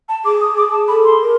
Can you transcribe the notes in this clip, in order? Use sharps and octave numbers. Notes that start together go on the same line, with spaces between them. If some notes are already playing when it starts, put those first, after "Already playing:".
A5
G#4 D6
D#6
D6
A5
A4 B5
C6
A#4